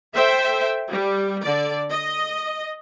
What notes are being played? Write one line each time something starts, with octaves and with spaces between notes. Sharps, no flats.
A4 C5 E5 G5
G3
D3 D5
D#5